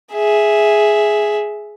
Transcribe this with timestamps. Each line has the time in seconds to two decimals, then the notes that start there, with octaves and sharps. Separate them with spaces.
0.13 G#4 E5